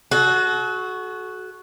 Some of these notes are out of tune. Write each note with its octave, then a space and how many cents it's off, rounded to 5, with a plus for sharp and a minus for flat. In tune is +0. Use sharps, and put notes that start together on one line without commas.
F#4 +0 A4 -45